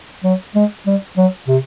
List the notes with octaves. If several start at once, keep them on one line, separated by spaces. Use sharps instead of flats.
F#3
G#3
G3
F#3
C3